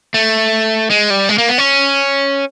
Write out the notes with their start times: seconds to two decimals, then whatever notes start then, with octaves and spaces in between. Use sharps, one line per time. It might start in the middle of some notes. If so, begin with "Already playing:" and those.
0.14 A3
0.90 G#3
1.10 G3
1.29 G#3
1.38 A#3
1.49 B3
1.58 C#4